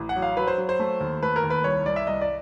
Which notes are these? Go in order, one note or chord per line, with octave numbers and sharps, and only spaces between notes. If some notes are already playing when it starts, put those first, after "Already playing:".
Already playing: A1
F#5
F#3
F5
F#3 B4
C5
F#3
C5
A3
D#2
A3 B4
A#4
D#2
B4
C2 C#5
C2 D5
E5
C2 D#5
D5